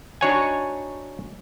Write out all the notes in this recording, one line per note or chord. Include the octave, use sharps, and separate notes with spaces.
D4 D#4 F#4 C#5 F#5 G#5